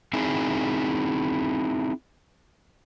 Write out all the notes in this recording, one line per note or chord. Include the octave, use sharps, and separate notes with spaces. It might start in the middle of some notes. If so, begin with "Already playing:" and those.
C4 D#4 E4 G#4 G#5